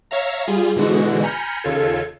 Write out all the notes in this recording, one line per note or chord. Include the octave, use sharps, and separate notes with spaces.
C#5 E5 F5 A#5
G3 F4 G#4
G#2 B2 D3 E3 G#3 F#4
G#5 A#5 B5 F6 G6 C#7
D#2 C#3 F4 A4 G#6